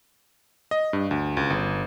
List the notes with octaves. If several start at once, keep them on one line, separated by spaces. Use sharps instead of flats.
D#5
G2
D2
C#2
G1